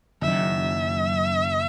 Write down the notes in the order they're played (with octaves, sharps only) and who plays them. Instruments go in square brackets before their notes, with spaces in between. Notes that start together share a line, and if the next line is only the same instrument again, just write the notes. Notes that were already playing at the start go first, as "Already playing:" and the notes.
[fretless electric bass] F#1 F#2 D#3 [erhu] E5